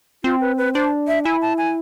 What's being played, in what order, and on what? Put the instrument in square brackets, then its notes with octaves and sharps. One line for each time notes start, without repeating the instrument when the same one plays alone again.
[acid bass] C4 [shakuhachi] F4
[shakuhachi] B4
B4
[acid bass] D4 [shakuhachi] C5
[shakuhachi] E5
[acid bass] E4 [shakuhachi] G#5
[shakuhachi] A5
G#5